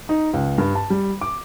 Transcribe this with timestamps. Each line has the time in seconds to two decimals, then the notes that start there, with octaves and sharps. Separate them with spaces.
0.09 D#4
0.33 C#2
0.58 G2
0.75 A5
0.90 G3
1.21 D6